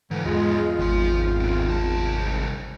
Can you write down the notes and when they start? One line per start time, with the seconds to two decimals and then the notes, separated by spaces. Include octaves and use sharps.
0.11 G#2 D3 E3 F3
0.26 E2 G#3 F4
0.79 G#1 F3 C6
1.41 F#3 C4
1.69 C2 A5